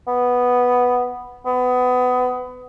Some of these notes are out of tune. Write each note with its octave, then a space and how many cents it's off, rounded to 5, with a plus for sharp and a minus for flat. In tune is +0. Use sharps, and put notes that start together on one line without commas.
B3 +0
B3 +25